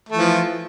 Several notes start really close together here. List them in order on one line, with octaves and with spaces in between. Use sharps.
A3 E3 F3